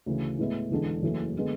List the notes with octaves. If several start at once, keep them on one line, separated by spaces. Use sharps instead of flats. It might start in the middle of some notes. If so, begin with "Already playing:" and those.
D2 C#3 E3
A2 G#3 B3 E4
E1 E2 D3 G#3 D4
F#1 F#2 E3 A3
D3 G#3 B3